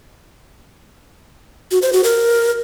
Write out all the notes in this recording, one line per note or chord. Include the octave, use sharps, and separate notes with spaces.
F#4
C5
F#4
A#4